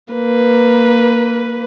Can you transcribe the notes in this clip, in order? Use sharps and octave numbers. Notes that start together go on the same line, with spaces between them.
A#3 B4